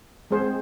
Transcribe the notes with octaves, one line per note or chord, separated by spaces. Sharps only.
G#3 C4 G#4 C5